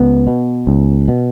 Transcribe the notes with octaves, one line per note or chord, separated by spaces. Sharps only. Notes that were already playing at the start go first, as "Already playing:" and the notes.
Already playing: C#2 B3
B2
C#2
B2